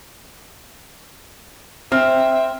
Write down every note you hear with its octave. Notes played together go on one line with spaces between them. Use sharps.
C4 E5 F6